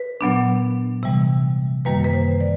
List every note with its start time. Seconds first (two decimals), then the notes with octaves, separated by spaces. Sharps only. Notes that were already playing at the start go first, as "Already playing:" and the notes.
Already playing: B4
0.21 A#2 F#3 B3 D4
1.03 C3 E3 G3
1.85 F#2 D#3 G3 A#3 B4
2.04 B4
2.13 C5
2.41 D5